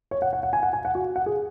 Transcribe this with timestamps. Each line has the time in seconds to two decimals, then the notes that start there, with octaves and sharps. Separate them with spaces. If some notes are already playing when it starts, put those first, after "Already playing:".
0.11 C#5
0.22 F#5
0.33 F#5
0.43 F#5
0.53 G#5
0.63 F#5
0.73 G#5
0.85 F#5
0.95 F#4
1.16 F#5
1.26 G#4